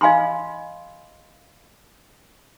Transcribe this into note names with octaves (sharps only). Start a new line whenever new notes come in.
D#5 F5 G#5 B5 C6